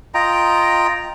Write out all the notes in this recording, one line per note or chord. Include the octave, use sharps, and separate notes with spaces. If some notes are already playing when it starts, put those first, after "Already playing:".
F4 D#5 G5 A#5